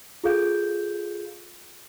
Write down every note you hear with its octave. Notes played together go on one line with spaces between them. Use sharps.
F4 G#4 A4 F5 G6